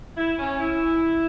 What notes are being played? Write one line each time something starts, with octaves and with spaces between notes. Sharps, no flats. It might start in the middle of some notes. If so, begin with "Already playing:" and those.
E4
C#4
E4